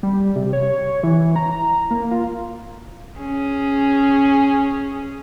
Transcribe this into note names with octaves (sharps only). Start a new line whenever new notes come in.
G3
C3
C#5
E3
A#5
A#3
F4
C#4 G#4